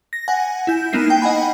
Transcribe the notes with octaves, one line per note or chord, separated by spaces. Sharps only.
A#6
F#5 G#5
E4 G6
A#3 B3 D#4 E4 C7
G5
D#5 F#5 G#5 B5